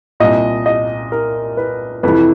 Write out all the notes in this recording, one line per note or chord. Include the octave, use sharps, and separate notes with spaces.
C2 A#2 D#5
D#5
A#4
B4
F2 C3 E3 B4